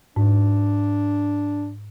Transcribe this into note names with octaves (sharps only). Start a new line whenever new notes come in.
G#2 D4